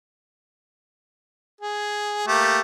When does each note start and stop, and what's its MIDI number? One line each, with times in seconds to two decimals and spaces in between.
1.61 2.24 68
2.27 2.61 57
2.27 2.61 58
2.27 2.61 67